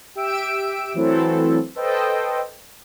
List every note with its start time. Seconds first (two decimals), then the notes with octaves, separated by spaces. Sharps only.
0.15 G4 E5 E6 D7
0.94 E3 F#3 A3 C4 E4 A4
1.75 A4 B4 C5 D#5 G5